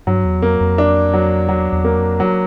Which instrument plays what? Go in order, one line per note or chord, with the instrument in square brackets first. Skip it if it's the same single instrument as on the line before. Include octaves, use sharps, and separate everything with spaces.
[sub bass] G2 [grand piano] F#3
[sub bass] E2
[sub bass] F2 [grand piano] A#3
[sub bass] F2
[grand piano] D4
F#3
[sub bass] E2 [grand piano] F#3
[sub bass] E2
[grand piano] A#3
[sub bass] F2
[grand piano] F#3